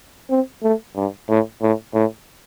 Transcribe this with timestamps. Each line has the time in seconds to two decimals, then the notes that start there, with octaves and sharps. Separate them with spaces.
0.30 C4
0.63 A3
0.96 G2
1.29 A2
1.62 A2
1.94 A2